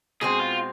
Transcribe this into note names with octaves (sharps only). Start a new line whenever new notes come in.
B2 G#3 C4 G#4
F4